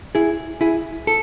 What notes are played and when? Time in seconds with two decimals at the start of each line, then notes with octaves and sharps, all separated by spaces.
0.15 E4 G#4
0.61 E4 G#4
1.07 A4